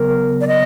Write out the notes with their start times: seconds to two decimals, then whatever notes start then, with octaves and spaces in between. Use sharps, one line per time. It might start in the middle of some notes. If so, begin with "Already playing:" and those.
Already playing: C#3 F#3 B3 A#4
0.41 D5
0.47 D#5